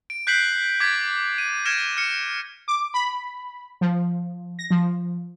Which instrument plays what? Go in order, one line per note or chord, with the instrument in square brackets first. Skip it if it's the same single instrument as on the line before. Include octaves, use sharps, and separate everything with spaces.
[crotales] D7
F#6 G6 B6 C7 D7 F#7
D6 G#6 A6 B6 D7
D#7
F6 G#6 A#6 C#7 D7 E7
F6 C#7
[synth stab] D6
B5
F3
A#6
F3